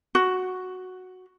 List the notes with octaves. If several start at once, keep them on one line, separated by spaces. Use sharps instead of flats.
F#4